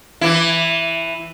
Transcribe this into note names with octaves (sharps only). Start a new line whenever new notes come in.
E3 E4